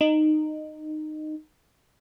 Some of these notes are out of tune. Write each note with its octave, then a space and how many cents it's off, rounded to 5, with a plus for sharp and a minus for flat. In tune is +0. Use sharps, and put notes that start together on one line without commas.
D#4 -15